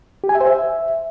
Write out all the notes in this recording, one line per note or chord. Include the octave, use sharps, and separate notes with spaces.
G4
G#5
E5
C5
E5